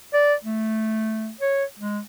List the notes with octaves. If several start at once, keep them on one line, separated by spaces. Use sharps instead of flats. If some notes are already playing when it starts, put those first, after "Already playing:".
D5
A3
C#5
G#3